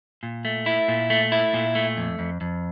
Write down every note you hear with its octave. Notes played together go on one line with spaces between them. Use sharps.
A#2
A3
E4
A#2
A3
E4
A#2
A3
F2
F2
F2